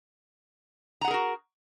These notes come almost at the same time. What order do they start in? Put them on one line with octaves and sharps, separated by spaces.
A#5 F#5 G#4 A#4 F#4